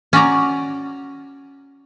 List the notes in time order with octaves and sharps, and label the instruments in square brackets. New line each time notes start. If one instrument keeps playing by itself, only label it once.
[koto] C#4 F#4 D5 A#5